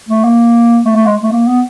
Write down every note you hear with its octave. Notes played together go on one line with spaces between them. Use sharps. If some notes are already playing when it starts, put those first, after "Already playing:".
A3
A#3
A3
A3
G#3
A3
A#3
B3